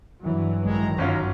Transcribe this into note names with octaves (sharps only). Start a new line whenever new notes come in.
G2 E3 F#3
A1 D#3 G#3 A#5
G1 F#2 C#4 F4